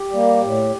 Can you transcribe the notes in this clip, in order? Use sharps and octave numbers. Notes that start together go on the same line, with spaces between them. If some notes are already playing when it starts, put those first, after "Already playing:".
Already playing: G4
G3 A#3
A2